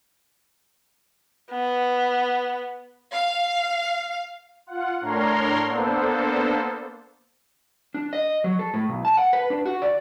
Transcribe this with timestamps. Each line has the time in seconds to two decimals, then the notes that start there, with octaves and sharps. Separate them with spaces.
1.51 B3
3.13 F5
4.67 F4 F#5
5.01 A2 D4 A#4 C#5 A#5 C6
5.65 A#3 B3 D4 A4 C5
7.94 D4
8.13 D#5
8.44 F#3
8.59 A4
8.74 A2
8.89 B1
9.05 A5
9.17 F#5
9.33 B4
9.50 D4
9.66 F#4
9.82 D5